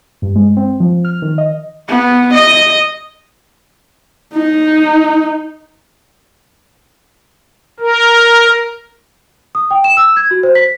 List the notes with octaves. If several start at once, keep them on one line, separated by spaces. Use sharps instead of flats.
G2
G#3
C4
F3
F6
D#3
D#5
B3
D#5
D#4
A#4
D#6
G5
E7
E6
G#6
F#4
C5
B6